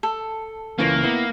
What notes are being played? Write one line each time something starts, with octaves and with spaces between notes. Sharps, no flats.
A4
C#2 E3 A#3 C#4
B3 E4